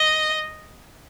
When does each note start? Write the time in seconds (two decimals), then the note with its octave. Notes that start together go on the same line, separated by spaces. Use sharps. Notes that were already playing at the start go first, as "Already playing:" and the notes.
Already playing: D#5